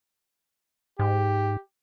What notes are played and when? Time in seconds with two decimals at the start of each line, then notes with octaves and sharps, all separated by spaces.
0.99 G#2 G4